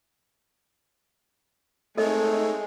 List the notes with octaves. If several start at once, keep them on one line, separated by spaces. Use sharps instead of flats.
G#3 A3 C4 D#4 A4 A#4 C#5 D#5